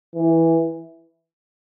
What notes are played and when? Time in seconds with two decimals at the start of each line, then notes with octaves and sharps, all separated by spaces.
0.15 E3